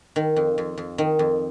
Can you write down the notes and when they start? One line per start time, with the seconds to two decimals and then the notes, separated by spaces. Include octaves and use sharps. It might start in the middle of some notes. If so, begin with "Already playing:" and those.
0.16 D#3
0.37 F2
0.58 F2
0.78 F2
0.98 D#3
1.19 F2